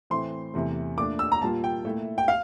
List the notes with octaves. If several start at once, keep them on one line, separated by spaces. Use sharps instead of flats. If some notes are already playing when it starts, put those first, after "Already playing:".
A2 E3 A3 C4 C6
E2 C3 E3 A3
A#2 A3 D4 D6
E6
A#5
A#2 G3 A#3 F4 A5
G5
A#2 A3 E4
G5
F5